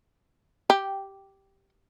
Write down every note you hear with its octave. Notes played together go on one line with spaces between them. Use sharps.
G4